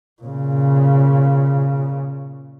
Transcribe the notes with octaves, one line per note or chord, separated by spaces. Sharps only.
A#2 C#3